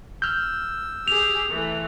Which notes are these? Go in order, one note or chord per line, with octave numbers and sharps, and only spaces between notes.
E6 F6 G6
G4 G#4 F7
E3 A3